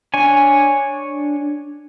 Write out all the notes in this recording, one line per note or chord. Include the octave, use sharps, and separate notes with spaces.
D4 C#5 G#5